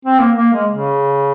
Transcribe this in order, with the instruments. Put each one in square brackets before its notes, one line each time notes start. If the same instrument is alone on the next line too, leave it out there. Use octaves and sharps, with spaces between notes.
[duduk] C4
A#3
A#3
G#3
C#3